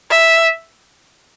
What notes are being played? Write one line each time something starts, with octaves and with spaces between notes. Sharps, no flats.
E5